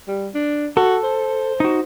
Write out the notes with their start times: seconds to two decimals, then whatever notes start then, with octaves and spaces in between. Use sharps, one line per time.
0.08 G3
0.34 D4
0.77 F#4 A4
1.04 C5
1.60 D#4 F#4